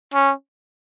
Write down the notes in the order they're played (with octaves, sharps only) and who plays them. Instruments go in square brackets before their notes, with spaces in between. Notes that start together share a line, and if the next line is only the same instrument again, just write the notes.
[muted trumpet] C#4